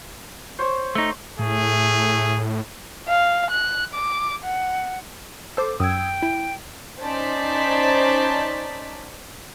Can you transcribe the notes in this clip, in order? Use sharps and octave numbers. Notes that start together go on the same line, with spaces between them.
C5 C#5
A3 D#4
A2 A3 G#4
F5
F#6
D6
F#5
A4 C5 D6
F#2 G5 D#6 E6 G#6
E4
C#4 D#4 C5 D5 A5 B6